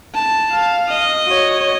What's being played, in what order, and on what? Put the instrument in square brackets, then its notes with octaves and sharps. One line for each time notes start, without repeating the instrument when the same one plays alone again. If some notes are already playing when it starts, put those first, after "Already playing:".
[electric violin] A5
[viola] F5
[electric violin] D#5
[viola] F#4 C#5